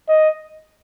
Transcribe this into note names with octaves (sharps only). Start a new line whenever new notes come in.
D#5